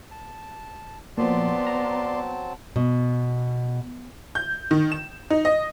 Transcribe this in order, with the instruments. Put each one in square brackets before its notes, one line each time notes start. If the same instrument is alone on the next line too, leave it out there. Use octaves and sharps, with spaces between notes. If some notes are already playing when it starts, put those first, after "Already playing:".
[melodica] A5
[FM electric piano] A#2 F3 [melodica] F#3 C4 A5 [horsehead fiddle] B3 [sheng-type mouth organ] D5 C6
[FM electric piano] A#5
[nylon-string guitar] B2
[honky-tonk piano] G6
D#3
E7
D#4
D#5